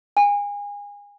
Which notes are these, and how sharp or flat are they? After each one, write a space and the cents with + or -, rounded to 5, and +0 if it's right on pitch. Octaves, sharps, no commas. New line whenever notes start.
G#5 -30